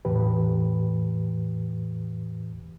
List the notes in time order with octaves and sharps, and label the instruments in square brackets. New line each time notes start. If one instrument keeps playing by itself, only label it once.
[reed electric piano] E2 A2 E3 G4 B4